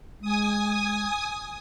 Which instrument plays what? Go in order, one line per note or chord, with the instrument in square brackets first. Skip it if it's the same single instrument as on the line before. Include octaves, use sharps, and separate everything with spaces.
[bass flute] G#3 [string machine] G#5 D#6